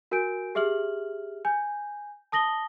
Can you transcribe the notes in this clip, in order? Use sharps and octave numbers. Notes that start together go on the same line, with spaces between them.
F#4 A#4 G#5 G6 D7
G4 G#4 E5 F6 F#7
G#5 G6
A5 D#6 A#6 F#7 G7